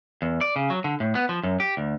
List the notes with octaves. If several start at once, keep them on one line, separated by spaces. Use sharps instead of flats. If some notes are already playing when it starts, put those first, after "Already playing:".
E2
D5
C#3
F#3
D3
A2
B3
F3
F#2
G4
D2